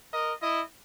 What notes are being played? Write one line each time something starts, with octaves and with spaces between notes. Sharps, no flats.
A#4 D#5
E4 D#5